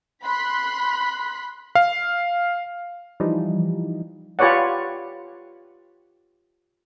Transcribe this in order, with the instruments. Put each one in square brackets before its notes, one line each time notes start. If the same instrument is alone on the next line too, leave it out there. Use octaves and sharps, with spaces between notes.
[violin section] B5 C6 F#6 B6
[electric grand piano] F5
[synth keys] E3 F3 G3 D#4
[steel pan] F4 G4 B4 C#5 D5 F#5